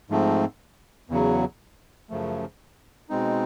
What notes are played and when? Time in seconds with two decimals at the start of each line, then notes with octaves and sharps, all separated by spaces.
0.10 G#2 F3 A3 C4
1.10 E2 C#3 F#3
2.10 F#2 C#3 F3 A3
3.09 B2 G#3 C4 D#4